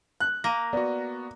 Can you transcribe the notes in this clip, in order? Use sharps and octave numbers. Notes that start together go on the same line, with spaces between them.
F#6
A#3 A#6 D#7
B3 F#4 D5